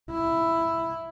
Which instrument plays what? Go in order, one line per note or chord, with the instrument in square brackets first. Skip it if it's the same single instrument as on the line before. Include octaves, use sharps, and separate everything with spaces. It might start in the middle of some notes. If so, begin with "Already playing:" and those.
[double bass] E4